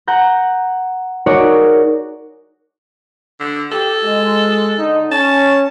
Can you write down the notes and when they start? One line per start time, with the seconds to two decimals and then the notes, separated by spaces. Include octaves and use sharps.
0.08 F#5 A#5 G6
1.26 D#4 F#4 G#4 A#4 C#5 D5
3.40 D3
3.72 G4 A4
4.03 G#3
4.77 D3 D#4
5.11 C#4 A5